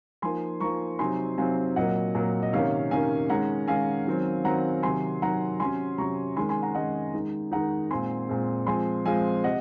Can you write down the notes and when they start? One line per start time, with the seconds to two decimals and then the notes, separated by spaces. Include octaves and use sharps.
0.22 F3 A#3 D#4 G#5 C6
0.60 F3 A#3 D#4 A#5 C#6
0.99 C3 F#3 C4 D#4 G#5 C6
1.38 C3 F#3 C4 D#4 F5 G#5
1.76 A#2 F#3 A#3 D#5 F#5
2.15 A#2 F#3 A#3
2.43 D#5
2.53 C3 D#3 A#3 C#4 C#5 F5
2.91 C3 D#3 A#3 C#4 F5 G#5
3.30 D#3 G#3 C#4 F#5 A#5
3.68 D#3 G#3 C#4 F5 G#5
4.07 D#3 F#3 C4
4.44 D#3 F#3 C4 F#5 A#5
4.83 C3 D#3 F#3 G#5 C6
5.22 C3 D#3 F#3 F#5 A#5
5.60 C3 F#3 C#4 G#5 C6
5.98 C3 F#3 C#4 A#5 C#6
6.36 D#3 G#3 C#4 G#5 C6
6.49 G#5 C6
6.62 F#5 A#5
6.75 D#3 G#3 C#4 D#5 F#5
7.14 D#3 G#3 D#4
7.51 D#3 G#3 D#4 F#5 A#5
7.91 A#2 G#3 C4 G#5 C6
8.29 A#2 G#3 C4
8.67 F3 G#3 C4 G#5 C6
9.05 F3 G#3 C4 F5 G#5
9.44 C3 D#5 F#5